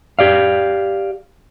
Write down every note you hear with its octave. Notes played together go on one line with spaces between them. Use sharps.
G4 D5 F5